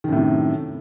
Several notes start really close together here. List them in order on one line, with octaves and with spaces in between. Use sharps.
D#3 F#2 A2 C3